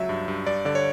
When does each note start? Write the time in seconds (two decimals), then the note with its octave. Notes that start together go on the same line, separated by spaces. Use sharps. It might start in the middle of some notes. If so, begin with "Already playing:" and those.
Already playing: C#2 F#3 E5
0.09 G2
0.28 G2
0.46 G2 D5
0.65 D3 D5
0.75 C#5